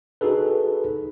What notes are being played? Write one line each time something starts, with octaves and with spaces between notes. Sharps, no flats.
D#4 F#4 G#4 A4 B4